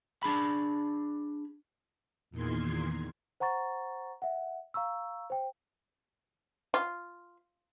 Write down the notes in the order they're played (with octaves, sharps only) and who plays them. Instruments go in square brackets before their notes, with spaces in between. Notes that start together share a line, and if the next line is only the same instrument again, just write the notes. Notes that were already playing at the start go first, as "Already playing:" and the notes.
[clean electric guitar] D4 G#4 B5
[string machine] E2 A#2 D#3 C6 G#6
[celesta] C5 F#5 A#5 C#6 A6
E5 F#5
F5 A#5 C#6 E6
C5 G5
[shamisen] F4